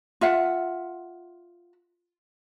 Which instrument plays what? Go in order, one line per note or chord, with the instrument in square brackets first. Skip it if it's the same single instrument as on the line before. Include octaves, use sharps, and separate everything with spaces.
[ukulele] F4 E5 F#5